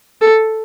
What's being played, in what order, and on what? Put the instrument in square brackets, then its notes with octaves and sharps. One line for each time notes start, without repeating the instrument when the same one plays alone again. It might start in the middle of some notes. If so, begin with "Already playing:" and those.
[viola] A4